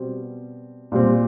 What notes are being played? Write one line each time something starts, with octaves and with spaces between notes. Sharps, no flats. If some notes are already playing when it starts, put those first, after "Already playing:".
Already playing: B2 G3 C4
A#2 G3 C4